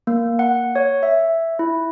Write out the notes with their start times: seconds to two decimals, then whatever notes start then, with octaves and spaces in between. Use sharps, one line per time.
0.07 A#3
0.39 F#5
0.76 C#5
1.03 E5
1.59 E4